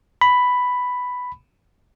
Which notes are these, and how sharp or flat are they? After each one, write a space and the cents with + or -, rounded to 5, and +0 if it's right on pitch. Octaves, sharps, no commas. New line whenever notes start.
B5 +5